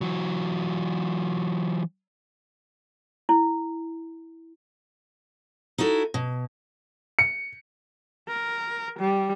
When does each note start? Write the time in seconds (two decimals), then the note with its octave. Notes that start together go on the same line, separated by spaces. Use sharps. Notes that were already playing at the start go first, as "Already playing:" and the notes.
0.01 E3 F#3
3.29 E4
5.78 D#4 E4 F#4 A4
6.14 B2
7.19 C#7
8.29 A#4
8.99 G3